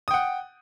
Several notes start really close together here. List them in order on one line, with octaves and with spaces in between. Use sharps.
D#6 G5 F#5